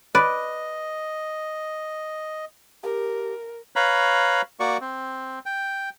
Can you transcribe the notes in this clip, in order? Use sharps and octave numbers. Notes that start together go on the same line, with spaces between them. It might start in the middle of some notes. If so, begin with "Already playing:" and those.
B4 D5 D#5
G4 A#4
B4 C#5 F5 A#5 B5
A#3 F#4 D5 C#6
C4
G5